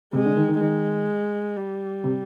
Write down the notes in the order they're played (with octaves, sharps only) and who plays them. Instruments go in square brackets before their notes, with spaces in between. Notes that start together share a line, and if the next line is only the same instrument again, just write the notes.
[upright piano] C3 [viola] G#3
[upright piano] D3
D#3
D#3
[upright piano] D#3 [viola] G#3
[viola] G3
[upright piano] C3